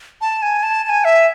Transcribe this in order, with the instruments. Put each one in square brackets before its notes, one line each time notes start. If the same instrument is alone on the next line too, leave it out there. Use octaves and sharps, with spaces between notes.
[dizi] A5
G#5
A5
A5
G#5
E5